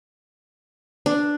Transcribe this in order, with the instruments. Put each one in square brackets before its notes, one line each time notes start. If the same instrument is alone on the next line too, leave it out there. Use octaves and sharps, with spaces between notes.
[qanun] D4